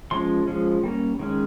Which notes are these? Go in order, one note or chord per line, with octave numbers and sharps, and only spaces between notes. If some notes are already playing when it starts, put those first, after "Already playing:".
F3 G#3 C#4 C6
F3 G#3 C#4
G3 A#3 C#4
D#3 G#3 C#4